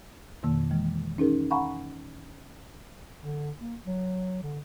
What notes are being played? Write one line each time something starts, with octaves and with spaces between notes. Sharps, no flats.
F2 B2 D#3 A#3
E3 G#3
C#4 D#4 G#4 A#4
F5 F#5 G#5 A#5 B5 C#6
D3
A#3
F#3
D3